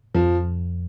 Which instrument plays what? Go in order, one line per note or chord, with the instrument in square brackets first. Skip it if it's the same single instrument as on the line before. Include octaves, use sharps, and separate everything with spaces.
[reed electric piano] F2 [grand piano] F3